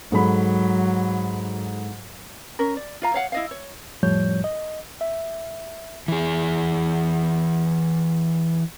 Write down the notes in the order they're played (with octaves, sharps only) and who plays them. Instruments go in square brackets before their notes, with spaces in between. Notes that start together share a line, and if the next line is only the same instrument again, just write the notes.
[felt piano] G#2 A4 B5 [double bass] F#3
[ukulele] C#4 A#4
D5
F4 F5 A#5
C#5 F5 F#5
E4 D#5 F5
C#5
[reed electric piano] F2 A2 F3 G3 C#5 G6
D#5
E5
[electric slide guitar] E3 G#4